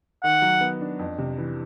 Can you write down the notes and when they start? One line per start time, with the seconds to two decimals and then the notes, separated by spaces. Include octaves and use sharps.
0.23 D#3 F#5
0.42 F#3
0.61 B3
0.81 D4
0.99 F2
1.18 C3
1.38 E3